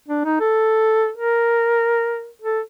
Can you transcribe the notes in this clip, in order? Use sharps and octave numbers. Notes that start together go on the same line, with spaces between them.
D4
D#4
A4
A#4
A4